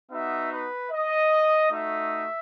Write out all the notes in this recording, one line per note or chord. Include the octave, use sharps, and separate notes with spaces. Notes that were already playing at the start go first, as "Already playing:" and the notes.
B3 D#4 F#4 E5
B4
D#5
A3 D#4 F#4 E5